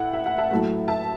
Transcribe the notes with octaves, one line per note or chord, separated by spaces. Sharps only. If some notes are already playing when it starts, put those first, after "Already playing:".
Already playing: A2 A3 E4 F#5
E5
F#5
E5 A5
A2 F#3 A3
E5 A5